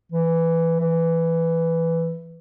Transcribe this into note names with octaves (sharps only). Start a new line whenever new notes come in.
E3
E3